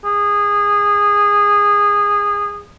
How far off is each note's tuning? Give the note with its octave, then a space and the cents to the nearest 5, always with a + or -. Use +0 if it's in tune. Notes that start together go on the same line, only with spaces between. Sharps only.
G#4 -20